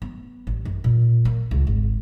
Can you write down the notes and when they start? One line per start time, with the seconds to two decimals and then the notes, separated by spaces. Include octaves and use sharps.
0.02 B3
0.47 A1
0.65 F#2
0.84 A#2
1.25 A#3
1.51 C#2
1.67 G#1